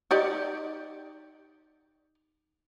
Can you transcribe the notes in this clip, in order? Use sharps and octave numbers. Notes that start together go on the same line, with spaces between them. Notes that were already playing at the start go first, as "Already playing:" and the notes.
D#4 G4 D5